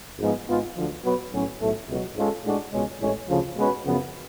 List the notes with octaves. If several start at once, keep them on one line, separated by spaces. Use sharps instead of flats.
G#1 G#2 F3 G#3 B3
G#1 G#2 G#3 B3 F4
D2 D3 F3
B2 F#3 B3 F#4 B4
B1 A2 F#3 C#4
B1 A2 F#3 A3
C#2 B2 F#3
G#2 G#3 C#4 F4 A4
A2 G#3 D4 F#4
C#2 B2 G#3 C#4
A1 A2 G#3 C#4
D2 C#3 F3
B2 G#3 C#4 F#4 B4
F#2 C#3 F3 B3